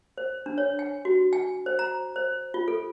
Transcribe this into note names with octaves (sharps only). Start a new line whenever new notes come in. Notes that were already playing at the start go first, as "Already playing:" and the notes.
C5
D4
C#5
G#5
F#4
G#5
C5
A#5
C5
F4
A4